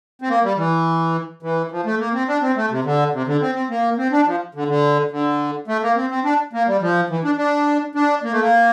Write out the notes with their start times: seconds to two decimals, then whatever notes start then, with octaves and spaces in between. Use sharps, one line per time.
0.22 C4
0.29 A#3
0.43 G3
0.57 E3
1.43 E3
1.71 F3
1.85 A3
1.99 A#3
2.13 C4
2.28 D4
2.42 C4
2.56 A3
2.70 C3
2.84 D3
3.13 C3
3.27 D3
3.41 C4
3.55 C4
3.70 A#3
3.98 C4
4.12 D4
4.26 F3
4.55 D3
4.68 D3
5.11 D3
5.68 A3
5.82 A#3
5.96 C4
6.10 C4
6.24 D4
6.53 A#3
6.67 G3
6.81 F3
7.10 E3
7.24 D4
7.38 D4
7.95 D4
8.23 A#3
8.32 A3
8.41 A#3